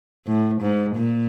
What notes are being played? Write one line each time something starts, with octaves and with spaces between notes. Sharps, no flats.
A2
G#2
A#2